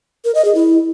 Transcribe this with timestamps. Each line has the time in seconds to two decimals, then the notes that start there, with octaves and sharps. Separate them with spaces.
0.25 A#4
0.35 D#5
0.45 G#4
0.55 E4